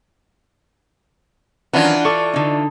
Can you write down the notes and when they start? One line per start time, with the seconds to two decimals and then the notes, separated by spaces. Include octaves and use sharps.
1.73 D#3 E3 F#3 C#4 D4 F4 F#5
2.05 A4 D5 C#6
2.34 D3 D#4